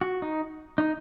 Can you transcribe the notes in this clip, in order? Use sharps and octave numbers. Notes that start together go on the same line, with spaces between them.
F#4
D#4
D#4